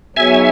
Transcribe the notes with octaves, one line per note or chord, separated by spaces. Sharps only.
F#3 B3 D#4 G#4 C#5 E5 G#5